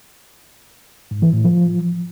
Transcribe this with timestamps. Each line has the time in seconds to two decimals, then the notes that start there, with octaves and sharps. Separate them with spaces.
1.11 G#2
1.22 E3
1.33 A2
1.44 F3